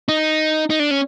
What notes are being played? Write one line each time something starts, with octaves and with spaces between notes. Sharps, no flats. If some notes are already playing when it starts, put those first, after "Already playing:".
D#4
D#4
D4
C#4